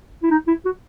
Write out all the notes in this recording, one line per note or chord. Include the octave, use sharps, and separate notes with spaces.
E4
D#4
E4
F#4